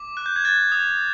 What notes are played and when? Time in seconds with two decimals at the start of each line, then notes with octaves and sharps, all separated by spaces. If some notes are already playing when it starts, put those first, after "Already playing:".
Already playing: D6
0.17 F#6
0.26 G6
0.36 G#6
0.45 F#6 A6
0.72 D#6